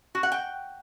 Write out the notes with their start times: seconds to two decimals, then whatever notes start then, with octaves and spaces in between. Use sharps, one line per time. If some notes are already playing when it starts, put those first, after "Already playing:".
0.15 F#4
0.23 F#5
0.32 G5